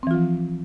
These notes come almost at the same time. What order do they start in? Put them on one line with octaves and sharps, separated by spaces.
C4 E3 F4 F3